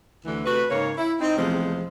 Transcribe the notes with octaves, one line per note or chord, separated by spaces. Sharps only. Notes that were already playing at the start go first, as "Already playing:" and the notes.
D2 D3 E3
C3 A3 F#4 B4
G#2 C#3 A#3 C#5
E4
C4 D#4
E2 C3 F3 G#3 A3 C4